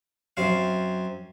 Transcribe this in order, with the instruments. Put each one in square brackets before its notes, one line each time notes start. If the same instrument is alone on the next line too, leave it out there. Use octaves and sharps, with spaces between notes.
[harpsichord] F#2 C4 F5